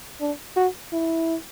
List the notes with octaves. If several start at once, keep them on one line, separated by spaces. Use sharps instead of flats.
D4
F#4
E4